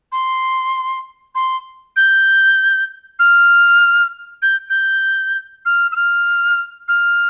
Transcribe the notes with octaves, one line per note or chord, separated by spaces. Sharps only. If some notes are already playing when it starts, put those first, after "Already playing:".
C6
C6
G6
F6
G6
G6
F6
E6
F6
F6